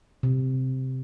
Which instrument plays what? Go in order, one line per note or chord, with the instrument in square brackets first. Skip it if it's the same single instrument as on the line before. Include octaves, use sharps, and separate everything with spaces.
[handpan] C3